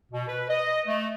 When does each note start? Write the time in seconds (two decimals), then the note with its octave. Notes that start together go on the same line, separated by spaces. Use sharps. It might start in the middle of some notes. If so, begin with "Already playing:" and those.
0.11 B2
0.28 B4
0.49 D#5
0.87 A3